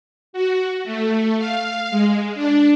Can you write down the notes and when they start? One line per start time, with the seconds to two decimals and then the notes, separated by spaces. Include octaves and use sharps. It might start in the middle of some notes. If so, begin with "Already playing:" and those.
0.33 F#4
0.84 A3
1.38 F5
1.91 G#3
2.35 D4